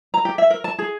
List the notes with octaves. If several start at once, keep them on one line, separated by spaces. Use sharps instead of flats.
A#5
G4
E5
A#4
A5
G#4